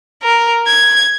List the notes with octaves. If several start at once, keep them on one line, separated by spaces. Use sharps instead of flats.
A#4
G#6